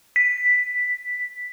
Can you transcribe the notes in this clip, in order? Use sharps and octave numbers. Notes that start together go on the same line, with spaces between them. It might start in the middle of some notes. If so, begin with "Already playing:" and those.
B6